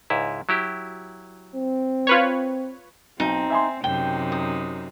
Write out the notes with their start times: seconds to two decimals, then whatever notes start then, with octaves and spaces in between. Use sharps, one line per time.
0.10 C#2 G#2 E4
0.49 F#3 E4 G4
1.56 C4
2.07 F4 B4 C#5
3.20 B1 C4 D#4
3.50 E5 G#5 C6
3.84 F#2 C3 D#4 G5 G7
4.32 D#6